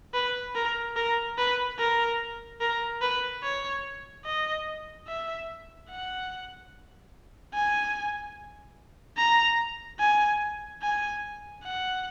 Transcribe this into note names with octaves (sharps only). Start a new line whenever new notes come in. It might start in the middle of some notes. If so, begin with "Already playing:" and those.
B4
A#4
A#4
B4
A#4
A#4
B4
C#5
D#5
E5
F#5
G#5
A#5
G#5
G#5
F#5